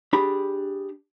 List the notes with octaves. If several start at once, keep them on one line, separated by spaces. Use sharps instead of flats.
D4 G4 G#4 B5